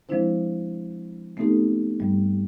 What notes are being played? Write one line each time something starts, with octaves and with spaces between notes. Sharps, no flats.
F3 G#3 C4 D4 E4 C5
A3 B3 C4 D#4 G4 A4
G2 G3